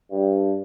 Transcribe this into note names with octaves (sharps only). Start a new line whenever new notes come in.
G2